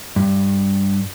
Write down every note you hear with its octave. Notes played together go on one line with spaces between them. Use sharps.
G2